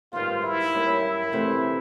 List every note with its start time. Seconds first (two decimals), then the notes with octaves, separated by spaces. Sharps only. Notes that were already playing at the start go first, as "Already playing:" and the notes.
0.13 G#2 D#3 G3 B3 F4
0.43 E4
0.72 F#2 D#3 G3 A#3 C#4
1.02 E4
1.32 F2 C3 E3 A3